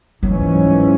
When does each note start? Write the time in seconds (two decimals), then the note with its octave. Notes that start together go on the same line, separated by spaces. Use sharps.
0.23 G#2 E3 F#3 C#4